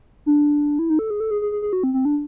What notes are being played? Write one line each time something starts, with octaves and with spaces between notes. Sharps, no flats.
D4
E4
D#4
A4
G#4
A4
G#4
G#4
G#4
G#4
F#4
C4
C4
D4